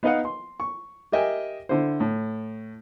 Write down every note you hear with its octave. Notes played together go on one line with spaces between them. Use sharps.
B3 D#4 B4 D#5 F5 F#5
C6
C#6
G4 A#4 D#5 E5 G5 G#5
D3 E4 C5
A2